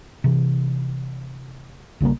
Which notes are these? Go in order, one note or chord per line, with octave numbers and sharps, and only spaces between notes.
C3 E3
A#1 C#3 G3 A#3